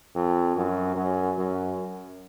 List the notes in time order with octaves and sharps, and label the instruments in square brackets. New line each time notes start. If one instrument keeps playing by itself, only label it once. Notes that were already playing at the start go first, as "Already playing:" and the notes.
[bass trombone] F2
F#2
F#2
F#2